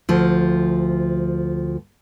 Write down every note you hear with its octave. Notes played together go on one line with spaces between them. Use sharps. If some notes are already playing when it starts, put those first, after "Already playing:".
D2 F3